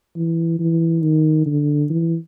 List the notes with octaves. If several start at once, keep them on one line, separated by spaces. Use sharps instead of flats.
E3
E3
D#3
D3
E3